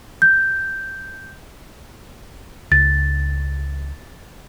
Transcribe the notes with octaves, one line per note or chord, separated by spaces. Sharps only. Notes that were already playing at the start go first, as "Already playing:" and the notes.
G6
C#2 A6